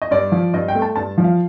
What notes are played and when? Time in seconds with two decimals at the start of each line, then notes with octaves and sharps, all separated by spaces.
0.02 D#5
0.11 G2 D5
0.32 F3
0.54 G2 D#5
0.68 G5
0.75 A3
0.82 A5
0.96 G2 A5
1.18 F3
1.24 F5